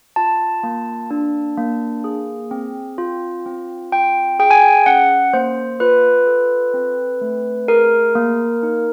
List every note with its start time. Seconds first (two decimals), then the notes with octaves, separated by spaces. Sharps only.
0.16 F4 A5
0.63 A#3
1.11 D4
1.58 A#3
2.04 G#4
2.51 C4
2.98 F4
3.46 C4
3.92 F4 G5
4.39 G#4 G5
4.51 G#5
4.62 G5
4.86 C#4 F#5
5.33 A#3 C5
5.80 F4 B4
6.27 A4
6.74 C4
7.21 A3
7.68 G#4 A#4
8.15 A#3
8.63 D#4